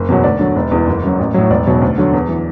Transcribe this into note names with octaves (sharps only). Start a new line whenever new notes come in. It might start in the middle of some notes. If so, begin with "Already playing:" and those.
Already playing: F#1
E2 B2 F#3
D2 D5
D3 F#3
E1
E2 E3
F#1
F#2 F#3
A1
A2 F#3
E1 D5
E2 B2 F#3
D2
D3 F#3
E2
E3